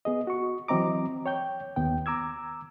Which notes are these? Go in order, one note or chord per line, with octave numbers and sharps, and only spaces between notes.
B3 G#4 D#5
F#4 C#6
E3 F#3 C4 D#5 A#5 D6
C#5 G5 G6
D#2 B3 G5
A#5 D6 E6 G#6